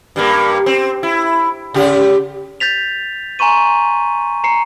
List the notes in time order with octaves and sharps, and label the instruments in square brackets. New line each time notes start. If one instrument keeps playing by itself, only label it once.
[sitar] G2 G3 A#3
C4
E4
C#3 G4
[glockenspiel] G6 A6 B6 F7
G#5 A#5 C6 C#6 D#7
A#5 C7 C#7